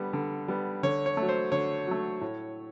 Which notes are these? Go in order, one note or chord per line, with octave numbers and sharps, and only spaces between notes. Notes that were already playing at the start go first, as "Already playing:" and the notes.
Already playing: D3 G3 B3
D3
G3 B3
D3 C#5
C#5
F#3 A3
C5
D3 C#5
F#3 A3
A2